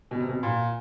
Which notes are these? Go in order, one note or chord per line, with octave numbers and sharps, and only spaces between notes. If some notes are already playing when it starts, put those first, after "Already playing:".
B2
C3
B2
A#2